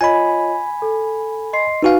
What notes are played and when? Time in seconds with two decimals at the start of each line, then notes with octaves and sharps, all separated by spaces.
0.01 F4 C#5 D#5 G#5 B5
0.82 A4
1.53 D#5 C6 C7
1.83 D#4 F#4 B4 F5 G#5